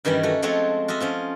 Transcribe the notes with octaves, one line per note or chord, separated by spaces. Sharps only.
G2 D#3 E3 G3 C#4
A3 F#4
F3 G#3 A3 C4 F#4 C#5
F4 F#4 D#5 E5
F3 C#4 F4